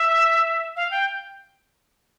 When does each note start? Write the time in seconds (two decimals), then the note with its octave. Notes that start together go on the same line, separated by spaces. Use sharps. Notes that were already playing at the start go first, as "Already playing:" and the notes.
Already playing: E5
0.76 F5
0.91 G5